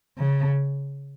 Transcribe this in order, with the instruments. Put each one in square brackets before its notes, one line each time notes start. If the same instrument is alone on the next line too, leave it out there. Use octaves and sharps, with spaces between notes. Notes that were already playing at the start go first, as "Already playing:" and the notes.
[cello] C#3